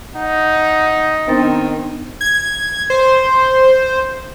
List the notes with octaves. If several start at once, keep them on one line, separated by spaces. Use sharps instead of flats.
D#4 F#5
D#3 B3 C4 D4 A6
G#6
C5